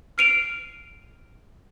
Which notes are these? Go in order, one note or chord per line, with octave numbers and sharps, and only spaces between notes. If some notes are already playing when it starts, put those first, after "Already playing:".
F6 C7 D7 D#7 F7